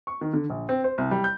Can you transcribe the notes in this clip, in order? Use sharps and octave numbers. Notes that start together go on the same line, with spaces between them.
C#6
D#3
D3
A#1
C4
C5
C2
G3
G6